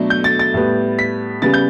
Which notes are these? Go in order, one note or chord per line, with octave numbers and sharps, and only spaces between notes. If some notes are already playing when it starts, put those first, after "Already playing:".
Already playing: B2 F#3 A3 D4
G6
A6
A6
A2 G3 B3
B6
C#3 G3 B3 A6
G6